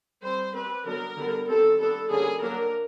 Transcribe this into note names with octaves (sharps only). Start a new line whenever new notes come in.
G3 C4 C5
G3 C4 B4
D3 F#3 B3 D4 A#4
D3 G3 B3 D4
D#3 G3 C4 A4
G3 B3 D4 A4
D3 G3 A#3 C#4 G#4
F#3 A#3 D4 A#4